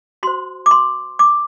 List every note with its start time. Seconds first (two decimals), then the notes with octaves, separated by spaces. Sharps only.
0.23 F#4 C5 C6
0.66 D6
0.71 C6
1.19 D6